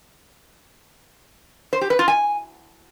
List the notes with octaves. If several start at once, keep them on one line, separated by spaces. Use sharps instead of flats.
C5
G4
B4
F4
G#5